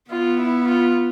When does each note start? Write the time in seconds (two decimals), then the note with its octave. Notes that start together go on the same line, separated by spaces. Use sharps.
0.11 B3 F4
0.40 E4
0.68 F4